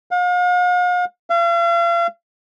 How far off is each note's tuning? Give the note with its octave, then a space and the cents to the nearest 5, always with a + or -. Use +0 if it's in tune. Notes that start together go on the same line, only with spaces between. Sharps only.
F5 +45
F5 -40